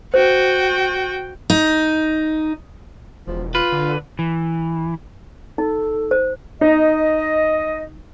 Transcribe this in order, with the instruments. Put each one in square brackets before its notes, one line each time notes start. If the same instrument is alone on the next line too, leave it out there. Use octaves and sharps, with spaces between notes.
[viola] F#4 G5 [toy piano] C5
[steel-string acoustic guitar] D#4
[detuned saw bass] E1 [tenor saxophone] F3
[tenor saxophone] F4 [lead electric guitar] B4
[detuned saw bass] D3
[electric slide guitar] E3
[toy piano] D#4 [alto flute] A4
[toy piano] C5
[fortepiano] D#4 [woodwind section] D#5